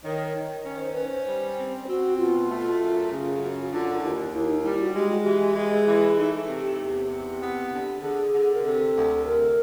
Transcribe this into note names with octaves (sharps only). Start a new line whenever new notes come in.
D#3 C#5
D#3
C#4 C#5
C5
C#4 B4
C5
G3
C4
C4 F#4
B2 F4
A3
F#2
C#3
F#2
F#4
D3 F4
D#2 E4
D#2 E4
D#4
G3 E4
F#4
G#3 G4
F#4
E3 G4
G#3 G#4
E3
A3 D#4
C3
G4
E2
C3
B3
D3
D3 G#4
D3
A#4
C3 A4
D2
C3 A#4